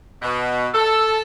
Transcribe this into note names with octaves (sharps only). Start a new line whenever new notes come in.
B2
A4